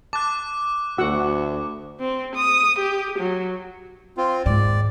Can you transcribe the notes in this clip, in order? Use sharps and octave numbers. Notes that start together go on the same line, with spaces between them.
A5 D6 F#6
D2 F#4 F#5 E6
C4
D#6
G4
F#3
C4 F4
D#2 G#2 D5